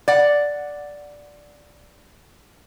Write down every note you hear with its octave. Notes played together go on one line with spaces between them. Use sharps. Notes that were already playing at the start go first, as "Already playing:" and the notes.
D5 F#5